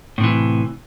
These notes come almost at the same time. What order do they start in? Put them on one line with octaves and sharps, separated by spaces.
A2 C3 E3